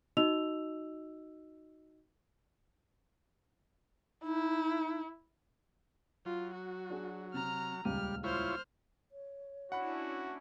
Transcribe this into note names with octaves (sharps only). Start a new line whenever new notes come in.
D#4 F#4 D#5 E6 F7
D#4 E4
F#3 F4
F#4
D4 G#4
C3 A#5 F6
D#1 C#2 G3 F6 D#7
E4 F4 C5 C#5 F6
C#5
C#4 D4 E4 F#4 F#5 B5 F#6